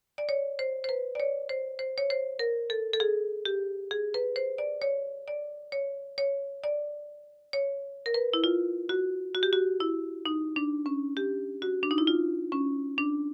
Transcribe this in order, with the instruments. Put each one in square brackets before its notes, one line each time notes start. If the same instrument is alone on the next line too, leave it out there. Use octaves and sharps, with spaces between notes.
[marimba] D5
C#5
C5
C5
B4
D5
C#5
C5
C5
C#5
C5
A#4
A4
A4
G#4
G4
G#4
B4
C5
D5
C#5
D5
C#5
C#5
D5
C#5
A#4
B4
E4
F4
F#4
F#4
G4
F#4
E4
D#4
D4
C#4
G4
F#4
D4
D#4
E4
F4
C#4
D4